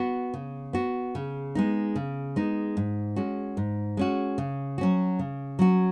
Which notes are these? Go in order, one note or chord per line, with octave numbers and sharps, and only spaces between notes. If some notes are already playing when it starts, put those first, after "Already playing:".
Already playing: B3 F#4
C#3
B3 F#4
C#3
G#3 B3 D#4
C#3
G#3 B3 D#4
G#2
G#3 C#4 F#4
G#2
G#3 C#4 F#4
C#3
F#3 C#4 F#4
C#3
F#3 C#4 F#4